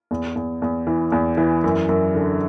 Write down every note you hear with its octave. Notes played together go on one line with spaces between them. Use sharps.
E2
E2
E2
E3
E2
E3
F#2
F#2
D3